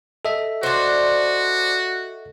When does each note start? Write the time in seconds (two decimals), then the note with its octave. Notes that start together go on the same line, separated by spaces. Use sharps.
0.25 A4 D#5 E5
0.63 D4 F#4 C5